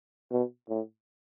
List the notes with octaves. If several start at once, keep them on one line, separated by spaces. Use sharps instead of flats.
B2
A2